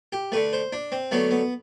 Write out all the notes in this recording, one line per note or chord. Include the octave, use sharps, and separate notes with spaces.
G4
D3 A3 B4
C5
D4
C4
D3 F#3 A3 B3
B3